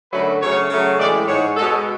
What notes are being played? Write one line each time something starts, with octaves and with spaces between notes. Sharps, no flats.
F#2 D3 F#3 A3 B4
C#3 F#3 A3 C#5
C#3 F#3 A3
A2 E3 G#3 D5
G#2 G#3 C#5
B2 G#3 A4